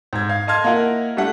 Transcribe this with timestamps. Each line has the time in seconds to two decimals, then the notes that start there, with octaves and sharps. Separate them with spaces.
0.13 G#2 G#6
0.29 F5 G#6
0.47 D#5 F5 A5 C6 F6 G#6
0.64 A#3 E4 F4 A#4 D#5 F#5
1.17 G3 A3 D4 E4 A4 F#5